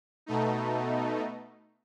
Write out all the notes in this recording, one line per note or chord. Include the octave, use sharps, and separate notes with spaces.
B2 A3 D#4